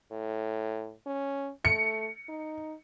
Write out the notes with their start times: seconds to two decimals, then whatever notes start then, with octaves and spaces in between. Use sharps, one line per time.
0.11 A2
1.06 C#4
1.65 A3 C#7
2.29 D#4